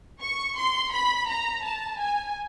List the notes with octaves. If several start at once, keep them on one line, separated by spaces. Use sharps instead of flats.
C#6
C6
B5
A#5
A5
G#5